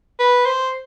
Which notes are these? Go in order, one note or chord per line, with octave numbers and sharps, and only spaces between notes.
B4
C5